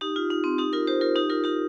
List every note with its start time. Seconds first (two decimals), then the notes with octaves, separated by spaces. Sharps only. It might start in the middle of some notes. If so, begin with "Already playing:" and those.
0.01 D#4 G4
0.16 F4
0.31 D#4
0.44 C4
0.58 D#4 G4
0.73 F4 A#4
0.87 G4 C5
1.01 F4 A#4
1.16 D#4 G4
1.30 F4 A#4
1.44 D#4 G4